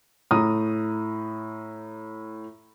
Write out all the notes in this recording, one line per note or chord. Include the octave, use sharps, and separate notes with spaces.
A2 A#5 D#6